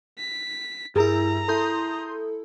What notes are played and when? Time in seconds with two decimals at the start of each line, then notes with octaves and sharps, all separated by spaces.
0.18 B6
0.96 G2 E4 G#4 A#4 A#5
1.48 E4 A4 C6 D#6 G6